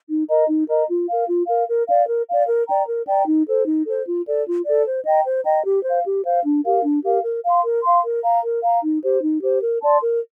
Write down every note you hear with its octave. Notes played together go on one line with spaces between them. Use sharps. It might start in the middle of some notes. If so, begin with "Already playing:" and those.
D#4
A#4 D#5 A#5
D#4
A#4 D#5 A#5
F4
A#4 F5
F4
A#4 F5
A#4
D5 F5
A#4
D5 F5
A#4
D5 G5 A#5
A#4
D5 G5 A#5
D#4
A4 C5
D#4
A4 C5
F4
A4 D5
F4
A4 D5
C5
D#5 G5 A#5
C5
D#5 G5 A#5
G4
C5
F5
G4
C5 F5
D4
G4 A#4 F5
D4
G4 A#4 F5
A#4
F5 C6
A#4
F5 C6
A#4
F5 A#5
A#4
F5 A#5
D#4
G4 C5
D#4
G4 C5
A#4
D5 A5 C6
A#4